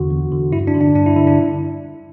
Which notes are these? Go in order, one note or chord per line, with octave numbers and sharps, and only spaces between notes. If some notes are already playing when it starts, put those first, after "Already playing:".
Already playing: E2 D3 F#4
E2
D3
G2 E4
D4
D3
D4
G2 D4
E4
D3 E4
D4